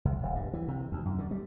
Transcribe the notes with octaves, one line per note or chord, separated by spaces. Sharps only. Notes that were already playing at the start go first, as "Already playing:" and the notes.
C2
D1
G2
E3
C3
D2
F#2
D3
G3